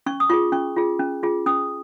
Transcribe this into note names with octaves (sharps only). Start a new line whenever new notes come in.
C#4 C#6
D#6
F4 G#4 C#6
C#4 C#6
F4 G#4
C#4
F4 G#4
C#4 D#6